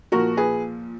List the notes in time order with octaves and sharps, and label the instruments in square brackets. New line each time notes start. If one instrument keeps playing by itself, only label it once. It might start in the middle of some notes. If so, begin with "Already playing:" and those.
[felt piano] A#2 F3 F#4 A#4
G#4 B4